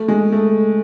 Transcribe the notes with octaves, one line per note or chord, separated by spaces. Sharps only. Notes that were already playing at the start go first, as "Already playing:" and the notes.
Already playing: A3
G#3
A3